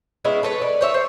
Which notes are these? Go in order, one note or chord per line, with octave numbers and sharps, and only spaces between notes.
G#3 B3 C#4 E4
A4 B4 C#5
D5
C5 C#5 E5
C5